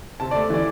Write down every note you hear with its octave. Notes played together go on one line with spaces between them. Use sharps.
C3 A5
A3 D5
E3 D5